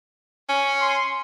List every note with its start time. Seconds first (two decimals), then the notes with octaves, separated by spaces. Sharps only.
0.49 C#4
0.80 C6